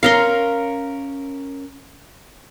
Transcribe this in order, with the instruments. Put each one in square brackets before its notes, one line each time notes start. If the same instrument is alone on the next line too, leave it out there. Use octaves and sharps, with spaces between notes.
[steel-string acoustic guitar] C#4 A#4 C#5 [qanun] F5 A#5 C6